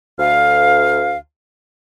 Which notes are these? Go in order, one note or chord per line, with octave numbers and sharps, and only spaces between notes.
D2 F5